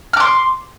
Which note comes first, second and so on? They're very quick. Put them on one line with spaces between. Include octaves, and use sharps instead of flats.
F6 D6 C6